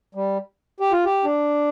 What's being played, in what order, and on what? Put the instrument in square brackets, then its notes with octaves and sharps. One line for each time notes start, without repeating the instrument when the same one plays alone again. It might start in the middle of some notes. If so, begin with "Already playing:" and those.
[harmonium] G3
G4
F4
G4
D4